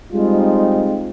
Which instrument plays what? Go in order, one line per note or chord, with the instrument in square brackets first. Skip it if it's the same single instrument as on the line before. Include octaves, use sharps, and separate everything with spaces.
[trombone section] G3 G#3 C4 D#4 F4